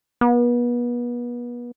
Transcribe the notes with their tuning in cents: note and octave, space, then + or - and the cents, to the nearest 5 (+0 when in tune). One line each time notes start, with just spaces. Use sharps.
B3 -35